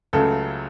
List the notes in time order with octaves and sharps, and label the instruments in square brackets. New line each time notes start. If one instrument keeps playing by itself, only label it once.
[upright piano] C#2 C#3 F#3 A3 A4